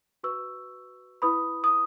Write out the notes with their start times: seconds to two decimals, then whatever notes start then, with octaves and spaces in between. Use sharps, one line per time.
0.23 F#4 B4 C#6 E6
1.22 E4 B4 B5 D#6
1.64 D#6